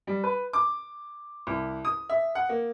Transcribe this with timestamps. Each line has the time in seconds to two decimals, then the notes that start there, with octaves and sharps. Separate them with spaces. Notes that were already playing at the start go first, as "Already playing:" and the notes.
0.07 G3
0.24 B4
0.53 D6
1.47 C2
1.85 D#6
2.09 E5
2.35 F#5
2.49 A#3